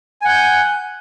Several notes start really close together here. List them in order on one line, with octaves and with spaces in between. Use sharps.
G#5 F#5 G6